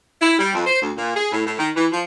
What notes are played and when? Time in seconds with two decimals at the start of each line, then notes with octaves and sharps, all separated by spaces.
0.20 E4
0.38 G3
0.52 F2
0.65 C5
0.81 D2
0.96 A#2
1.15 G#4
1.30 A2
1.45 A2
1.57 D#3
1.75 E3
1.91 F3